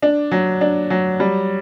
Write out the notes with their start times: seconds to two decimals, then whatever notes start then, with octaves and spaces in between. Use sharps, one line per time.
0.02 D4
0.32 F#3
0.61 D4
0.90 F#3
1.20 G3